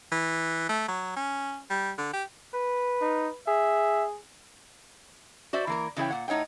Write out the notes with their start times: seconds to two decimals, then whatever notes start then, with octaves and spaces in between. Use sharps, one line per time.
0.12 E3
0.69 A3
0.88 F#3
1.16 C#4
1.70 G3
1.98 D3
2.13 G4
2.54 B4
3.01 D#4
3.47 G#4 E5
5.53 F#4 C5 D5 E5
5.67 E3 A#3 A#4
5.97 C#3 E3 E4 G#4 C#5 G5
6.10 A#2 F#5
6.28 A2 D#4 C#5 F#5 G5